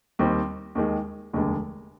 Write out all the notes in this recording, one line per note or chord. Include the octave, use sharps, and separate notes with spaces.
D#2 D#3 G3 C4
D#2 D#3 G#3
F1 D#2 D3 G#3